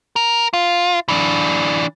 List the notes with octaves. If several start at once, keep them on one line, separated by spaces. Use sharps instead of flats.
A#4
F4
E3 D4